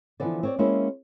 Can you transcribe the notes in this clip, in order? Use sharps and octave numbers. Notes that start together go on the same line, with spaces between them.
D3 E3 F3 B3 C4 D5
C4 C#5 D5
G#3 A#3 C4 C#4 E4